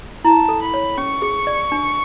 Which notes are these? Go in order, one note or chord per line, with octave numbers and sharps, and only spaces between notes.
E4 A5
A4
B5
C#5
C#4 C#6
G#4
D5
D4